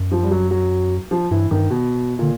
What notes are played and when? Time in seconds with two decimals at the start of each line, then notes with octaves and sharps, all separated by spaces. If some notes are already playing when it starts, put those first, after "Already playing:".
Already playing: F#2
0.12 F3
0.23 G3
0.31 F#3
0.51 F#3
1.11 F3
1.31 G2 E3
1.51 G2 D#3
1.70 B2
2.19 A#2 D3